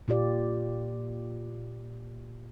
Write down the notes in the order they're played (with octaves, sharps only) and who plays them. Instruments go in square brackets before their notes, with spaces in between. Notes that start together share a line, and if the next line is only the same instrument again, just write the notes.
[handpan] A#2 F4 G4 D5